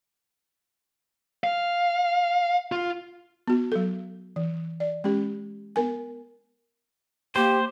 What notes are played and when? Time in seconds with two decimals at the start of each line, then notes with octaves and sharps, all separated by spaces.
1.44 F5
2.72 F4
3.47 B3 F#4
3.72 F#3 A4
4.36 E3
4.80 D5
5.04 G#3 C#4 G4
5.76 B3 A#4 G#5
7.36 A#3 G4 C5